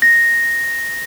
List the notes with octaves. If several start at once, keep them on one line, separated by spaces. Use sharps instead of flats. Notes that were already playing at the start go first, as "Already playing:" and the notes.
A#6